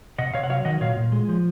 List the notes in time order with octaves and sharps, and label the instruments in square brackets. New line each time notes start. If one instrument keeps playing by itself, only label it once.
[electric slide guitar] C3 D#5 F#5
C3 C#5 F5
F#5
F#3 C#5 F5
D#3 D#5 F#5
A#2 C#5 F5
A#2
G#3
F3